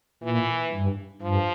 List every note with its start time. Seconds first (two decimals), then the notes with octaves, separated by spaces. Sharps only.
0.23 A#2 E3
0.72 G2
1.22 G2 F3